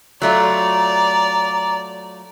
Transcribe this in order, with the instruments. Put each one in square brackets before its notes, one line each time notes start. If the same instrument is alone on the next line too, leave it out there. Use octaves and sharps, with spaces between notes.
[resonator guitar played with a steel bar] F#3 A3 F4 [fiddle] D5 [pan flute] A#5